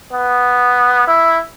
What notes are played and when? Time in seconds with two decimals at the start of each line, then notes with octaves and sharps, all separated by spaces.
0.13 B3
1.07 E4